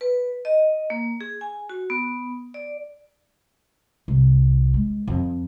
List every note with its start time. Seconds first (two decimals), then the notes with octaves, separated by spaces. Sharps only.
0.01 B4
0.45 D#5
0.90 A#3
1.21 G#4
1.41 G#5
1.69 F#4
1.90 B3
2.54 D5
4.08 C2
4.74 G#3
5.08 F2